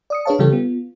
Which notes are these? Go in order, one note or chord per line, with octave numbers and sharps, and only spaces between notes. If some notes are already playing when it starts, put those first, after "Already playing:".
D5 D#6 C#7
D4 G#4 B4 C#5 F5 A5
C#3 E3 G3 F4 G4 A4
B3 F4